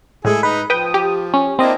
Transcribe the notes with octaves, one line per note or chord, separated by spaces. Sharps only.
A2 G#3 E4 G#4 A4
D#4 B4
F3 B4 G5 D#6
G4
C#4
A#3 C4 D4 E4 D#5